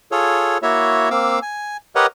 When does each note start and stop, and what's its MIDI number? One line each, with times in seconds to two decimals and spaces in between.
0.12 0.58 65
0.12 0.58 68
0.12 0.58 69
0.12 0.58 73
0.63 1.09 58
0.63 1.09 64
0.63 1.09 66
0.63 1.09 73
0.63 1.09 76
1.11 1.39 58
1.11 1.39 60
1.11 1.39 77
1.11 1.39 86
1.11 1.39 88
1.42 1.77 80
1.95 2.06 67
1.95 2.06 70
1.95 2.06 71
1.95 2.06 73
1.95 2.06 75
1.95 2.06 78